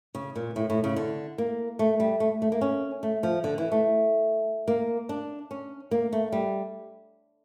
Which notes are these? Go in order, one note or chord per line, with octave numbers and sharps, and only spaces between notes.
C#3
A#2
A2
A2
C#3
D3
A#3
A3
G3
A3
A3
A#3
C#4
A3
F3
D3
E3
A3
A#3
D4
C#4
A#3
A3
G3